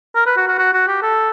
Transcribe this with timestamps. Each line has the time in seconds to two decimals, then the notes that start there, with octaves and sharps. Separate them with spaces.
0.15 A#4
0.26 B4
0.37 F#4
0.48 F#4
0.58 F#4
0.73 F#4
0.88 G4
1.02 A4